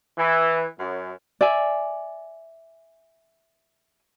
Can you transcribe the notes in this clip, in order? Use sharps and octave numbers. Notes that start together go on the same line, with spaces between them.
E3
F#2
D5 E5 G#5